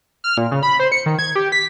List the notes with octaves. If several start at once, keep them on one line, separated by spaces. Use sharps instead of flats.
F6
A#2
C#3
B5
C5
C#7
D#3
G#6
G4
B6